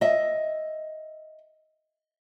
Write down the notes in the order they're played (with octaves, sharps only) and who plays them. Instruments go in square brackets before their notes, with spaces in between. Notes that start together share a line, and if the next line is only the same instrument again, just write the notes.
[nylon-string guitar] D#5 E5